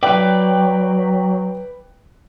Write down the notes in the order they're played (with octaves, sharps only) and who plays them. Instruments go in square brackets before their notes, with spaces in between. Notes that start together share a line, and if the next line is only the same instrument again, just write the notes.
[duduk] F#3 [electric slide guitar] B4 D5 [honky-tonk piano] G5 F#6